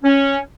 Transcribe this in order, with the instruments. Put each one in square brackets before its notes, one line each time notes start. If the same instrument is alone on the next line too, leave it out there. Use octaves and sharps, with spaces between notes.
[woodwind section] C#4